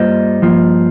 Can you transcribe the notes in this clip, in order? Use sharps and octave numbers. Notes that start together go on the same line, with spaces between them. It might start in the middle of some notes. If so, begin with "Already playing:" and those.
Already playing: G2 G3 A#3 F4 C5 D#5
G2 F3 A#3 F4